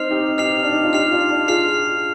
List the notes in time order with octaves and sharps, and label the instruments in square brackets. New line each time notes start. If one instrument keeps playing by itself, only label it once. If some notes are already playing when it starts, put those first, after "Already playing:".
Already playing: [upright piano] C4 D#4 [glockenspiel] F6 C7 F7
[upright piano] D#4 G4
[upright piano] D#4 G4 [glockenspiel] F6 C7 F7
[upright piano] D4
D#4
F4
[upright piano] D#4 G4 [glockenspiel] F6 C7 F7
[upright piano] D4 F4
D4 F4
[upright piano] F4 G#4 [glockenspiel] F6 C7 F7